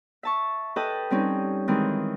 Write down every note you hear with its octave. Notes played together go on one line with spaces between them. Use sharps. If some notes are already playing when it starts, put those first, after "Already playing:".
E5 A5 C#6
A4 B4 D#5 G5 A5 B5
G3 C4 C#4 D#4
D#3 E3 G#3 C4